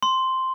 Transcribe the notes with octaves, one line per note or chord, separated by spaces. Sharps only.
C6